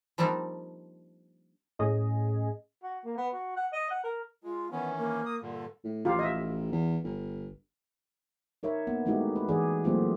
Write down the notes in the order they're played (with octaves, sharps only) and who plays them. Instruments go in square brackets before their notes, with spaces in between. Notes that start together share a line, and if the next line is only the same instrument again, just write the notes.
[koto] F3 G3 A#3 C4 D4 D#4
[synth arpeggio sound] A2 C#4 G#4 D#5
[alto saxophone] F#4
A#3
B3
F#4
F#5
D#5
F#5
A#4
[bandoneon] G#3 [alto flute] F4
[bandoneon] D#3 E3 C#4 [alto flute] B3
[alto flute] A#3
[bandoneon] D#6
G2 A#2 D3
[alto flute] A4
[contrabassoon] A2
[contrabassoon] A1 [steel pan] F4 G4 F5
[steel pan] D#5 E5
[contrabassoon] E2
G1
[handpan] D#4 A#4 C#5 E5
A#3 B3
G#3 A3 D#4 E4 F#4 G4
B4
E3 D#4 G#4 D5
F#3 A3 A#3 C4 F4 G4